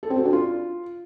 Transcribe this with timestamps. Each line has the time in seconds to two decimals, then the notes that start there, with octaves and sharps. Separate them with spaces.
0.03 A4
0.10 C4
0.18 F#4
0.25 D4
0.33 F4